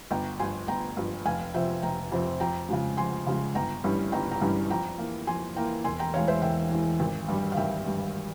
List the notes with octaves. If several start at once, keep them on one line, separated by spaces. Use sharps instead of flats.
G1 G5 A#5
G2 F3 G#5 C6
G1 G5 A#5
G2 F3
F1 F5 G#5
F2 C3 F3 C4 E5 G5
F1 G5 A#5
F2 C3 F3 C4
F2 G5 A#5
C#3 F3 G#3
F2 G#5 C6
C#3 F3 G#3
G1 G5 A#5
G2 E3 G3 C#4
G1 G5 A#5
G5 A#5
G2 E3 G3 C#4
F2 G5 A#5
E3 A#3
F2 G#5 C6
E3 A#3 G5 A#5
E1 G#5 C6
G5 A#5
E2 E3 G#3 C#5 F5
C5 E5
E1 E5 G5
E2 E3 G#3
G#1
G2 G3
F5
G#1 E5 G5
G2 G3